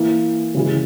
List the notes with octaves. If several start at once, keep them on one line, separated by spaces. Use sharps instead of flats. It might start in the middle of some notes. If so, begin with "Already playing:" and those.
Already playing: E3 A#3 E4
C#3 E3 G#3